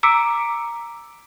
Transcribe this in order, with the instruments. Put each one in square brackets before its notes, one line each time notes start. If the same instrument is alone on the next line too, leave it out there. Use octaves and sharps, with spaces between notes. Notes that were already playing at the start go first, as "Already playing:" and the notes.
[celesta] A#5 D6 E6 B6 C#7 D7